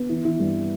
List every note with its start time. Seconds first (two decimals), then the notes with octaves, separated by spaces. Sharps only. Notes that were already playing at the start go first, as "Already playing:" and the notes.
Already playing: B3
0.09 E3
0.25 E3
0.40 G2